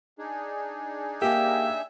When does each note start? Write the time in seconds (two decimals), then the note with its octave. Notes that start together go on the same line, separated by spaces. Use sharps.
0.19 D4 D#4 G#4
1.22 A#3 G4 E5